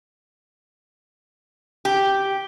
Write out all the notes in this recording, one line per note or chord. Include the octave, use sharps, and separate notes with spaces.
G4